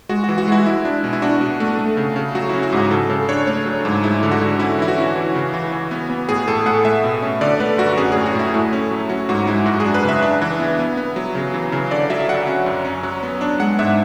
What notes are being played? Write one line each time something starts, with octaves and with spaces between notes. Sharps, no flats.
G#3 F#4
E3 F#4
F#4
G#3 E4
G#3 E4
D4
B2
E4
D4 F#4
B2
A3
A3
C#3
C#3
F#3 F#4
C#4 E4
F#4
G#2 G#4
C#3 A4
C#3 A4
D4 C#5
A3 C#5
F#3
G#2
G#3 E4
D3
F#4
D3
C#4 E4
E3 E4
F#4
C#4
E3
C#3
E3
E3
B3
B3
A2 G#4
A2 A4
A2 F#5
A3 E5
B2
C#4
D3 D5
A3 B4
F#2 F#4
C#4 G#4
A2 G#4
F#4
A2 E4
A3
C#4
F#3
C#4 F#4
G#2 F#4
G#3 E4
F#2 F#4
D4 G#4
B4
C#3 E5
D4 E5
E3
B3
B3
B3
F#3
C#3
E3
C#3
D3 D5
F#3 E5
F#3 F#5
C#4
F#2
C#4
F#3
B3
D4
G#3 F#5
G#2 E5